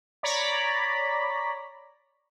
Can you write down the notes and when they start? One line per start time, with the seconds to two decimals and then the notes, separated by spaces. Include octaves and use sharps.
0.23 C#5 D5 A#5 B5